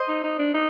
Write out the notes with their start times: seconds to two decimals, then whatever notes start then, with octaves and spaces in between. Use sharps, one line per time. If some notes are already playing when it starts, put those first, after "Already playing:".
Already playing: C5 D#5
0.08 D#4
0.24 D#4
0.39 D4
0.54 D#4